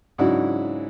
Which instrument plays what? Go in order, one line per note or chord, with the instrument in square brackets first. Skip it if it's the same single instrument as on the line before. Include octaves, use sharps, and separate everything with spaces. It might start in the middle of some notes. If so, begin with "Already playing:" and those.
[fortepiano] G#2 C#3 F#3 D4 E4 F#4